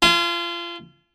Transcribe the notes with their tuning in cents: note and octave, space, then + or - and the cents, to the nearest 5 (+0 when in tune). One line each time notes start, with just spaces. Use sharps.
F4 -30 G#5 +30